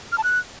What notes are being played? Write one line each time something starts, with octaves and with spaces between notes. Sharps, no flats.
F6
A5
F#6